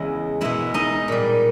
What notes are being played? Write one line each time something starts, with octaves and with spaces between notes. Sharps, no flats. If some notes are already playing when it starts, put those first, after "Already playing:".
Already playing: E2 C#3 G#3 E4 E5
B2 G#3 E4 E5
D#4 D#5
A#2 G3